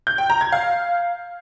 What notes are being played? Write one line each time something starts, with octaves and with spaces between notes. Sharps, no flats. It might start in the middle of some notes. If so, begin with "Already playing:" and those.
G6
G5
A#5
G#6
F5